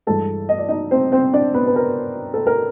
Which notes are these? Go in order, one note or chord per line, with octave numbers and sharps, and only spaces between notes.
G2 E3 G#3 A4 A5
D#5
D5
D#4 D#5
C4 C5
C4 C5
D4 D5
B3 B4
B4
A#4
A4
A#4